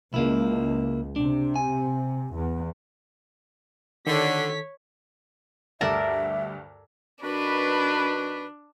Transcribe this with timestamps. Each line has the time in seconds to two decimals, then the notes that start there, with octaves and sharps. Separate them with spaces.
0.14 C#2 C#3 A#3 E4
1.16 C3 D4
1.56 G#5
2.34 E2
4.07 D3 D#3 A4 C#5 B6
5.81 D2 G2 A4 A#4 D5 E5 D6
7.23 D#3 D4 F#4 B4